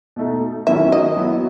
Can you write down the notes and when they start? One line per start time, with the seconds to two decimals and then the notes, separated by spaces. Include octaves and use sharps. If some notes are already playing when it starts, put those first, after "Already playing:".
0.16 B2 A3 D#4
0.67 D#3 F#3 C#4 E4 E5
0.92 D#5
1.17 F#3 B3 E4